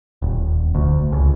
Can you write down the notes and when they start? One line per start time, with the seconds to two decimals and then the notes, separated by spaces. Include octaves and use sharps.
0.22 D#1
0.75 D2
1.12 C#2